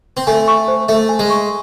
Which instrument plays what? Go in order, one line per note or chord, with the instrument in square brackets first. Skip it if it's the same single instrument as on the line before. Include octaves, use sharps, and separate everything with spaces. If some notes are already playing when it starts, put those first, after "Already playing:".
[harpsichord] C4
[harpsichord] A3 [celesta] G#5
[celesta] C#6
C5
[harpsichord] A3 [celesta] E5
[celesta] G#5
[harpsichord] G#3
[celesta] C#6